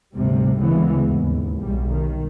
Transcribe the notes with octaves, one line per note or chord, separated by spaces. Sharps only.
D2 G#2 C3 G3
D2 C#3 E3 G#3 B3
D#2 G#2
B1 G3
D#3